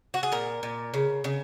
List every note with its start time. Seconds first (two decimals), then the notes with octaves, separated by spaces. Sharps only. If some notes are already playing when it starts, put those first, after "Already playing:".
0.14 F#4
0.23 G#4
0.32 A#2 A#4
0.63 A#2
0.94 C#3
1.24 C#3